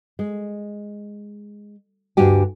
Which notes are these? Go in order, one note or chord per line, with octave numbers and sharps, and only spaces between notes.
G#3
D2 G2 D4 F#4 G4 G#5